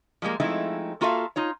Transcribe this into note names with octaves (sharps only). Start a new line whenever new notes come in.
F3 G3 G#3 A#3
F3 G#3 A3 C4 D#4 E4
A#3 F4 F#4 A4 E5 F5
D#4 F4 C#5